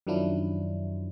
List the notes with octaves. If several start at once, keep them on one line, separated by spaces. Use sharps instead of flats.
F#2 D#3 F3 F#3 D4 E4